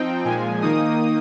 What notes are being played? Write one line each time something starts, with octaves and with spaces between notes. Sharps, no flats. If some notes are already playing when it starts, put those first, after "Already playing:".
Already playing: F3 C4 D#4 G5
A#2 F3 G#3 G#5
D#3 A#3 D#4 D#6